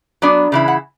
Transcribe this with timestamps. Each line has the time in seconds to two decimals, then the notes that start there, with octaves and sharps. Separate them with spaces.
0.22 F#3 B3 D4
0.52 C#3 E3 E4
0.68 F#5